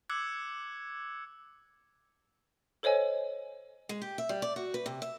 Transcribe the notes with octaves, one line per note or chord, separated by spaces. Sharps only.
D6 E6 F#6 G#6 C#7
A4 C5 C#5 D#5 G#5
G#3
G4
E5
G3
D5
F#4
B4
C3
E5